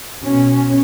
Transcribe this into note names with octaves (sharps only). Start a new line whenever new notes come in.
B2 C#4